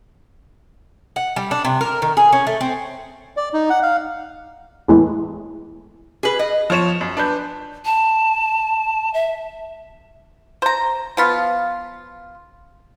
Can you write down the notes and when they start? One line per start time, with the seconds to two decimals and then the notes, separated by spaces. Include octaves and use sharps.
1.16 F#5
1.36 G3
1.51 D4
1.65 C3
1.81 A#4
2.02 D#3
2.17 G#4
2.32 C#4
2.47 A3
2.61 C4
3.37 D5
3.54 D#4
3.70 F#5
3.83 F5
4.88 E2 A2 E3 G#3
6.23 G#4 B4
6.39 D#5
6.70 F3 C#5 E7
7.01 F#2
7.17 D4 B4 G6
7.85 A5
9.14 E5
10.62 C5 A#5
11.17 F3 B3 F4